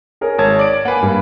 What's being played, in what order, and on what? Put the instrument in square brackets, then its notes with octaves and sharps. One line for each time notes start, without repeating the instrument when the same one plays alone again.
[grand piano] G#4 A#4 C#5
[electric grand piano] G#1 A5 G#6 [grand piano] C#5
[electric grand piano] D5 D7
[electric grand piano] A#3 B4 [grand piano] F#5 G#5
[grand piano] G2 B5